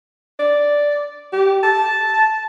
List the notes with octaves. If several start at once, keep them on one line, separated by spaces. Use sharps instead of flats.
D5
G4
A5